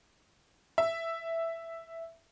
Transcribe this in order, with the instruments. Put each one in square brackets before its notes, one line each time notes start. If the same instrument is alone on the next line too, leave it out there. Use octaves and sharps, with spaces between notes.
[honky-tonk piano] E5